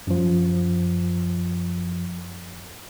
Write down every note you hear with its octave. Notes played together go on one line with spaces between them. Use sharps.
F#2 F3